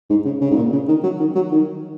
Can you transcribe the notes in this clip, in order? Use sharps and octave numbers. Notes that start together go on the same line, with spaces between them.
G#2
C#3
C#3
G#2
A#2
C#3
D#3
F#3
D#3
F#3
D#3